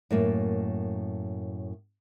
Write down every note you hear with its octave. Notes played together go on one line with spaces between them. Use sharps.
F#2 A2 A#3